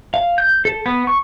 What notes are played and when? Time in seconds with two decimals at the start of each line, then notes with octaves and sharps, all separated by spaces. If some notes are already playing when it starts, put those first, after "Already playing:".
0.14 F5
0.38 G6
0.65 A4
0.86 B3
1.07 C#6